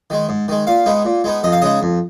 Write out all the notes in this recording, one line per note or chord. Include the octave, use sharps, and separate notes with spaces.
D#3 G#3
G#2
D#3 G#3
A#2 F5
G#3 B3 D#4
A#2
G#3 B3 D#4
F2 D#5
F5
C#3 G#3 D#4 D#5
F2